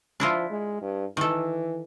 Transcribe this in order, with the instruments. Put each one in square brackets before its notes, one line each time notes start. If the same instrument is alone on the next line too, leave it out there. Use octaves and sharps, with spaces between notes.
[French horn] F3 [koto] D4 E4 F4
[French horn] G#3
G2
[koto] D#3 A4 [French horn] E3